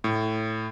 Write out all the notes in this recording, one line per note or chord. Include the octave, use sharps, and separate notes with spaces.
A2